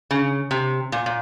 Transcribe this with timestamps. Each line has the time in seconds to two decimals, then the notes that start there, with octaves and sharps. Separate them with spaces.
0.11 C#3
0.51 C3
0.92 A#2
1.06 A#2